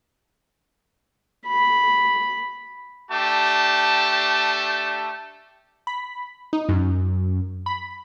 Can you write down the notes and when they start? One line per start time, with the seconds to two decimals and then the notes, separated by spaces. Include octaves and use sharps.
1.47 B5
3.11 A3 D4 G4 A5
5.87 B5
6.53 D#4
6.69 F#2
7.66 B5